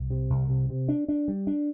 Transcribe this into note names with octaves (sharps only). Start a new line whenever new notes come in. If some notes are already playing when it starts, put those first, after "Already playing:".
Already playing: C2
C3
C2
C3
C3
D4
D4
G3
D4